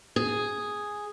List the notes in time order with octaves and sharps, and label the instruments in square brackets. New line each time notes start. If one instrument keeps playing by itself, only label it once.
[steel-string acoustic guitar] G#4